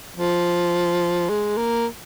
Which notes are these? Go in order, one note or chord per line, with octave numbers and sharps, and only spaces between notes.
F3
G#3
A#3